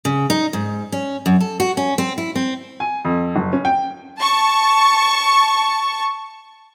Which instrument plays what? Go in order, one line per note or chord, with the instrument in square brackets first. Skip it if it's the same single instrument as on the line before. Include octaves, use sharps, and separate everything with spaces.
[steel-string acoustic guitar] C#3
D#4
G#2
C#4
F#2
A4
F#4
C#4
C4
E4
C4
[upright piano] G#5
F2
F#1
C#4
G5
[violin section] A5 C#6